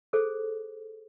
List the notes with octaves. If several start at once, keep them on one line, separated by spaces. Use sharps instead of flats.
G#4 A4 C5